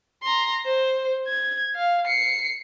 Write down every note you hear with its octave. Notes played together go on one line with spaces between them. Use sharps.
A#5 C6
C5
G#6
F5
C7 C#7